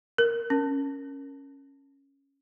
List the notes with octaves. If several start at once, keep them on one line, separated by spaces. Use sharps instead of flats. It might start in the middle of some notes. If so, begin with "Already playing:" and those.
A#4
C#4